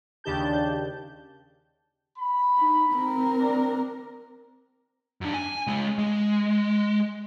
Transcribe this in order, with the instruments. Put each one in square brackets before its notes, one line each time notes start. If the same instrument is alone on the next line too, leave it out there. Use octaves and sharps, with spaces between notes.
[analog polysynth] D#2 C#3 D4 G4 A5 G6
[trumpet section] B5
[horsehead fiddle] D#4
C4 A#4
[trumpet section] D4
[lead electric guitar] F#2 D4
G#5
G#3 C#4
G#3